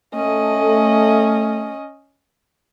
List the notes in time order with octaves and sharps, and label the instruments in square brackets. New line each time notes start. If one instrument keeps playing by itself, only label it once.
[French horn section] A3 [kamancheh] C#4 D#5